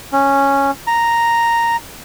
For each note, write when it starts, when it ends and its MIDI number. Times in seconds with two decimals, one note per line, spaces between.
0.13 0.71 61
0.87 1.76 82